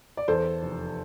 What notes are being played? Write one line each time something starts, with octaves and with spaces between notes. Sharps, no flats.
D5
E2 A4 C5
F1